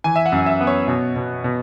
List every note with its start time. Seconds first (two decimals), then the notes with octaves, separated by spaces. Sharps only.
0.04 E3 G#5
0.16 E5
0.26 F#5
0.32 F#2
0.46 E5
0.61 B3
0.67 C#5
0.88 B2
1.16 B2
1.44 B2